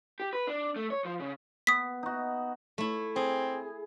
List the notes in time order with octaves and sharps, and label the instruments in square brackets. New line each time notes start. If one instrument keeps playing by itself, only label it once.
[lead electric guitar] G4
B4
D4
A3
C#5
F3
C#3
[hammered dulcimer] B3 [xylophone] D#6 B6
[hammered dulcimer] D#4 F#4
[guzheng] A3 E4
[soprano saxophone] C4 [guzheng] G#4